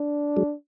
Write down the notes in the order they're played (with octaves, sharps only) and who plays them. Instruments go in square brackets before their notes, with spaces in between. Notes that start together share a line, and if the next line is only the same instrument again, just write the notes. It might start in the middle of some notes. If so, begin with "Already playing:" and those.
Already playing: [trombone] D4
[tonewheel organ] F#3 G#3